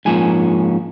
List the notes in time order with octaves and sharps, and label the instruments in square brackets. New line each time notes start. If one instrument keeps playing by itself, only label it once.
[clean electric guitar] G#2 F3 A#3 C#4 G#5